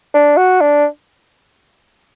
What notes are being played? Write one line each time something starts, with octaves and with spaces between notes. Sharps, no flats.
D4
F#4
D4